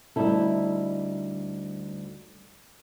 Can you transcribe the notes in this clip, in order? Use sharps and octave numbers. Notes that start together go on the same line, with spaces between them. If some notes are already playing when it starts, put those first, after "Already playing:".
D2 G3 D#4 E4 A4